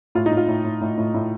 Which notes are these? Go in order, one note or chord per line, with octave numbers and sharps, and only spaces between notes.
A2 F4
D#4
A2
F4
A2
A2
A2
A2
A2